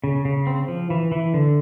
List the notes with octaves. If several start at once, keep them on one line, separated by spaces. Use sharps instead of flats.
C#3
C#3
C4
F3
E3
E3
D3